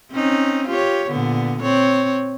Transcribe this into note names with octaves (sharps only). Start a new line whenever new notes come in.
C4 C#4 D#4
F4 G4 C#5
A#2 D3 B3
C4 C#5